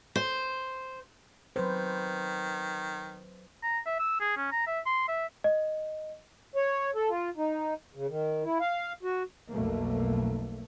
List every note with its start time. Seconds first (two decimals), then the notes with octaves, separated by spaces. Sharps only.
0.16 C5
1.56 D#3 F#3 B4 C5
3.63 A#5
3.86 E5
3.99 E6
4.20 G#4
4.37 C#4
4.52 A#5
4.67 E5
4.86 C6
5.08 E5
5.44 D#5
6.56 C#5
6.95 A4
7.10 F4
7.37 D#4
7.95 C#3
8.08 D#3
8.44 E4
8.60 F5
9.03 F#4
9.51 B1 F2 B2 A3 A#3